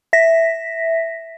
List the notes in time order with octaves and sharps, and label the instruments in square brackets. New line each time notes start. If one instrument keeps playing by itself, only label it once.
[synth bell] E5 A#6 B6